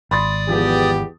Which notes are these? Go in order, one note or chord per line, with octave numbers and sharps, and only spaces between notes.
G#1 D5 B5 C6 D#6 A6
E2 F3 B3 G4 G#4